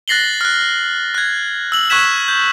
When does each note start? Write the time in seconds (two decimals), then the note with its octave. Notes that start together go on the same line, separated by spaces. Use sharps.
0.08 F#6 A6 A#6 C7 F#7 G7
0.41 F6 F#6
1.14 F#6 G#6
1.72 E6 F#7
1.90 C#6 E6 F#6 G#6 B6 E7
2.28 G6